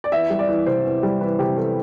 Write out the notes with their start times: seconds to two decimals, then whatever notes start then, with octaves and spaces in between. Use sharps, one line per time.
0.04 D5
0.12 E2 E5
0.30 G3
0.39 D5
0.49 E3
0.66 C3 C5
0.84 E2
1.03 G3
1.21 E3 B4
1.38 C3 G4
1.56 E2 A4